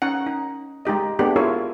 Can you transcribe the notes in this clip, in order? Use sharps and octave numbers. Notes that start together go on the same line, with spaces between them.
C#4 D#4 F#5
D#4
G#3 D#4 G4 D#5
A3 B3 D4 G4 G#4
E4 F4 G#4 A#4 C#5